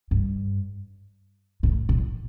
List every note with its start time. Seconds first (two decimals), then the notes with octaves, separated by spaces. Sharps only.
0.11 G2
1.63 A2
1.89 A#2